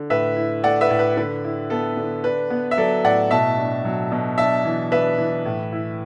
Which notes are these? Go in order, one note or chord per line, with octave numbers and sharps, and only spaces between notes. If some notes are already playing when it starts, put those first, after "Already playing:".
Already playing: D3
A2 B4 E5
E4
A3 D5 F#5
B4 E5
A2
B4
D3 B4
E4
B3 A4
D3
D4 B4
B3
E5
F#3 A4 D5
A2 D5 F#5
B2 E5 A5
D4
F#3
B2
D4 E5 A5
E3
D4 B4 E5
E3
A2
E4